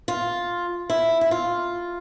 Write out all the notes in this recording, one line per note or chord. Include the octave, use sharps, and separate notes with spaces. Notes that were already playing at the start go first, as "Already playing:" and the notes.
F4
E4
E4
F4